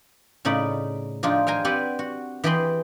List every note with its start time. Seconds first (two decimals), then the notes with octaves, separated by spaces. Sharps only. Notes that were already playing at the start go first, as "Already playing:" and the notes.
0.45 A2 C#3 D#4 D5 B5
1.23 F3 D4 D#4 F4 G4
1.47 F5 G5 G#5 A#5
1.65 C4 G4 B4 D5 F#5 G#5
1.99 F#4
2.44 E3 G4 G#4 B4 B5 C6